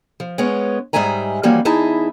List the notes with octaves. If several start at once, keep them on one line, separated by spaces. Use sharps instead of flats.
F3
G#3 B3 C#4 C#5
G#2 G3 G#3 E5 G#5 A#5
E3 F3 G3 A#3 C#4 F#4
E2 D#4 E4 G#4 A5